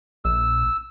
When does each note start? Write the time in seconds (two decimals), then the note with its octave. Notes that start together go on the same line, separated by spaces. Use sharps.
0.25 A#1 E6